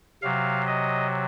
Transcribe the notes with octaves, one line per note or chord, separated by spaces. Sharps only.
C3 F#3 F5
D#5